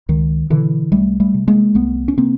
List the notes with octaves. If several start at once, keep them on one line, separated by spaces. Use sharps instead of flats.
C#2 D#3
B2 D3 E3
C2 G3 A3
G3 A3
C3
G#3 A#3
C2 A3 B3
C#4
C3 A#3 C4